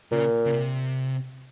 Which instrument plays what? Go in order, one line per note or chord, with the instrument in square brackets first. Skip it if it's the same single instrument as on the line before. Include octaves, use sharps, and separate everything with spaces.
[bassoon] A#2 [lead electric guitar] C#3
[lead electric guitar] C#3
C3